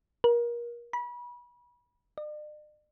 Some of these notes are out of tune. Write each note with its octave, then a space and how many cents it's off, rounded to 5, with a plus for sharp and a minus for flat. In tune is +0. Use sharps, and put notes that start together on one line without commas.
A#4 +30
B5 -30
D5 +45